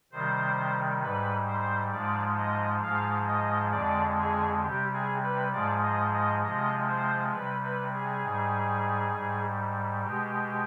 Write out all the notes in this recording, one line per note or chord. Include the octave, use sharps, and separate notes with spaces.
C3 D#3 G3 C5
G#2 G3 B4
C5
G#2 F3 G#3 D5
D#5
G#2 F3 G#3 F5
D#5
F2 D3 G#3 D5
G#4
C3 G3 G4
G#4
B4
G#2 F3 G#3 D5
D#5
D#5
C3 F3 G#3 D#5
C5
C3 G3 B4
B4
G#4
G#2 G3
G#2 G3
B2 G#3 G4